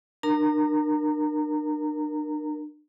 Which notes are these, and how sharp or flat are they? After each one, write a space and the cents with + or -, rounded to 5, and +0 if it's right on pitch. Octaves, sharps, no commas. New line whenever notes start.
D4 +40 A#4 +5 A#5 -25